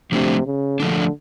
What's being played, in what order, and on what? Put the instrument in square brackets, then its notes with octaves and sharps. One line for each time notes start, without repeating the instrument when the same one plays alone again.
[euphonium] C3 [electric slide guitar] F3 A3 D4
[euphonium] C#3
[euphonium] D3 [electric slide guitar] F3 A3 D4